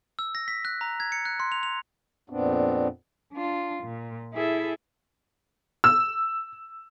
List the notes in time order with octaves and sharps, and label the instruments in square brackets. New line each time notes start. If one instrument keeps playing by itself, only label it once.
[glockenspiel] E6
A#6
B6
F#6
A#5
G#6
C#7
F#6
C6
F7
F7
[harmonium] F2 A#2 B3 C4 D4
[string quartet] D4 F4
A#2
E4 G#4 A4 E5
[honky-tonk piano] E6